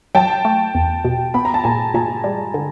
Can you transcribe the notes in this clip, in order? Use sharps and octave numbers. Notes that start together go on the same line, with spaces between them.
F#3 G5 A5
A3
E2
B2
B3 B5
A#5
A5
A#2 G#5 A#5
A#2 G#5 A#5
G3
D3